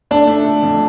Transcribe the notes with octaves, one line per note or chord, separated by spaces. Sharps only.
A3 D4
A3
A3
F2